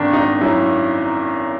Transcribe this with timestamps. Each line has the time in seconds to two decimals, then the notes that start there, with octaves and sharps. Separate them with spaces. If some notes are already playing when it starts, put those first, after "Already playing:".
Already playing: G#1 D#3 D4
0.13 G#1 D#4
0.41 F#2 E4